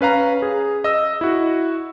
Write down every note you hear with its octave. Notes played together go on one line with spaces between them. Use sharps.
C#4 B4 F5 A#5
G#4
D#5 E6
E4 F#4